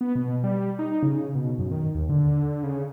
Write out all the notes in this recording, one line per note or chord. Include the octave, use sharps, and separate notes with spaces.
B3
B2
G3
D#4
C#3
B2
F#2
D#3
D#2
D3
C#3